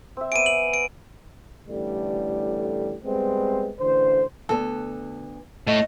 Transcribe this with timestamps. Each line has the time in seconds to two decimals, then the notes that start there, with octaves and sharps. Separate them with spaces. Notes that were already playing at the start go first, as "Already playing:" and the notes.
0.17 C4 E5
0.32 B3 D5 G#5 D7 D#7
0.46 F#7
0.74 D7
1.68 A1 A2 D3 G3
3.04 G3 G#3 B3 C4
3.79 A1 D3 C5
4.49 D2 B3 A4
5.67 A2 A3 C#5 D#5